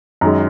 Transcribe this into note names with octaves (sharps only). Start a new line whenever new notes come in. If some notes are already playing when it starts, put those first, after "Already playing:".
F#2 D#3 G#3 A#5